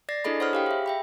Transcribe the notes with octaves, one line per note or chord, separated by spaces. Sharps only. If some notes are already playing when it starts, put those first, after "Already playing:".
D5 A6 A#6 C7
D4 E4 G#4 A4 D#5 B5
C5 C#5 F#5 B5 D#6 F6
G4 F5 G5
G#4 E5
E5 G5 B5